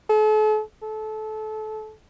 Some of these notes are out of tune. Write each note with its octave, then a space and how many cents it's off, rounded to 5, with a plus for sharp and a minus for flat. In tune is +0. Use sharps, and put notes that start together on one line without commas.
A4 -40
A4 -25